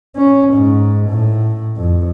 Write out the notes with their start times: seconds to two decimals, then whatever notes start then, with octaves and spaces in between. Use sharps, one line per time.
0.17 C#4
0.54 G#2
1.10 A2
1.77 F2